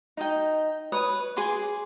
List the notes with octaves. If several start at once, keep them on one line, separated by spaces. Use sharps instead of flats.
D#4 D#5 G5
B4 C#5 D#6
G#4 G#5 C6 D6